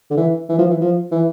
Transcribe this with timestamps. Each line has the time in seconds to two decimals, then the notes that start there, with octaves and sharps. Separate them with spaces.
0.11 D3
0.17 E3
0.49 E3
0.59 F3
0.70 E3
0.81 F3
1.12 E3